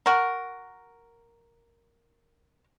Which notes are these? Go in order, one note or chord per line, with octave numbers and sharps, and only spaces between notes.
F#4 A#4